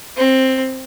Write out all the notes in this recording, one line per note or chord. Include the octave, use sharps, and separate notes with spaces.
C4